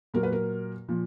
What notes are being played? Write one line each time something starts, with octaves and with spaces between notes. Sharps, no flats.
A#2 F#3 A#4
B4
A#4
A#2 F3